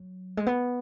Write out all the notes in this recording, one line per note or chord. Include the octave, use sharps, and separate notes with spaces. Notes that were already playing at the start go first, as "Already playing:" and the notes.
Already playing: F#3
G#3
B3